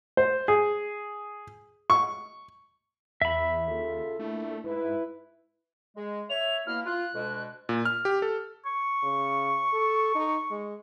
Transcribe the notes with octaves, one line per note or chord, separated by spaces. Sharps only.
C5
G#4
C#6
E2 E5 B5
D#2 C#3 F4 A4
A#2 A3 D4 E4
G#2 E4 B4
G#3
C#5 E5 F7
B2 A#3 E4 F6
F4 F#6
D2 B2 G#3
A#2
F6
G4
A4
C#6
C#3
A4
D#4
G#3